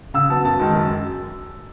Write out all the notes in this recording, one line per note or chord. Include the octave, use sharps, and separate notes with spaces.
C#3 E6
F#3 B3 A5
F#2 A5
D#3 G#3
F#2